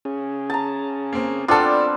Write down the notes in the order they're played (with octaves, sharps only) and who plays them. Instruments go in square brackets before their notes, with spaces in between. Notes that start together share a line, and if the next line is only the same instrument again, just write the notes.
[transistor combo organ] C#4 G#4
[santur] A5 A#5
[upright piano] A#3 C4
[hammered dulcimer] G3 B3 C4 [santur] D4 D5 A5 [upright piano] F4 A4